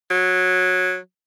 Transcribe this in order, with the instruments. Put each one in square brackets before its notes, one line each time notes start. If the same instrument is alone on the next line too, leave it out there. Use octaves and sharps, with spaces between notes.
[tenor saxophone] F#3